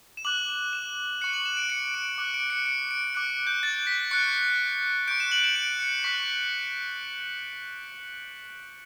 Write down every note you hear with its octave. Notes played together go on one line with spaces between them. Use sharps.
E7
D6 F#6 F#7
E7
E7
C#6 F#6 C#7
F#7
E7
D7
C#7
D7
D6 F#6
D7
C#7
C#7
D7
D6 F#6 D7
G6
A6
B6
C#6 F#6 C#7
C#6 G6 D7
E7
F#7
E7
D7
C#7
C#6 F#6 B6